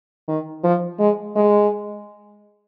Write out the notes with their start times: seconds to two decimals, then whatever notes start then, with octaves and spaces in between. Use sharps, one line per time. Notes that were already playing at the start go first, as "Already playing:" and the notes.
0.28 D#3
0.64 F3
0.99 G#3
1.36 G#3